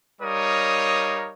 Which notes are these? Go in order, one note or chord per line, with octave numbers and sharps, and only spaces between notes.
G3 D#4 A#4 C#5 F5 D#6